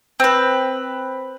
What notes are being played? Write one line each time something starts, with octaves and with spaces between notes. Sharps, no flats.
C4 B4